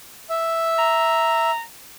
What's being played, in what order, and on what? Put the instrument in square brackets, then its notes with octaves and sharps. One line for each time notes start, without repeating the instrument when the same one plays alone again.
[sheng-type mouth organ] E5
[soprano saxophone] A#5